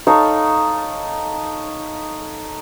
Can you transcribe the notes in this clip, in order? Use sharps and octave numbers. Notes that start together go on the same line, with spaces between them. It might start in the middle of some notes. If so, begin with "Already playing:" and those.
D#4 A4 C#5 F5